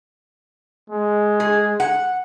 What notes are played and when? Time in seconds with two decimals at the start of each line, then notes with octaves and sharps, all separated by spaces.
0.90 G#3
1.40 G#4
1.80 F#5